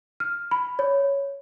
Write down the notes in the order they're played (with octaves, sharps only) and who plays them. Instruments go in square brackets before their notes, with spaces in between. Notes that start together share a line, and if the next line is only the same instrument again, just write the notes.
[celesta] F6
B5
C#5